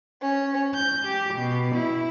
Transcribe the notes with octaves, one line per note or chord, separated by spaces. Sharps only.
C#4
G6
G4
B2
E4